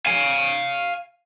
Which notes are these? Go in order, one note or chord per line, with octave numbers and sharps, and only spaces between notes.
F5 G#5